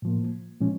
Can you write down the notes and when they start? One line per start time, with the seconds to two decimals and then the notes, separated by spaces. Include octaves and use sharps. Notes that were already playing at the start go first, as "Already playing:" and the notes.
0.02 A2 F3 A#3
0.61 A#2 F3 G#3 C#4